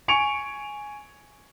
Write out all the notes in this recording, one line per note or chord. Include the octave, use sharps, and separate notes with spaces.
G#5 C#6 C#7 D7 F7